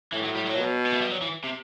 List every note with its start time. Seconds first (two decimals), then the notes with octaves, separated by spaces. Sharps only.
0.13 A2 E3
0.24 F#3
0.36 G3
0.47 F#3
0.57 B2
0.86 B3
0.93 A3
1.01 G3
1.11 F#3
1.22 E3
1.44 C3